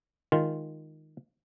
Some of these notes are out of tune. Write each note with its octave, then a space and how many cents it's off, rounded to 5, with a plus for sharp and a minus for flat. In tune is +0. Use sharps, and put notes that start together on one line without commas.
D#3 +0 G#3 +0 F4 +0